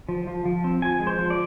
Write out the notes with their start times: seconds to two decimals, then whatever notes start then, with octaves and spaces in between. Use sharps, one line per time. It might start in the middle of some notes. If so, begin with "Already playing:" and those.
0.09 F3
0.27 F3
0.45 F3
0.64 C4
0.82 F3 G#5
1.00 G#3
1.07 C5
1.19 F3
1.30 D5